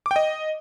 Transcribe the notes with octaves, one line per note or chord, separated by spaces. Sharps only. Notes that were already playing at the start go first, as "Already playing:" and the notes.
D6
G5
D#5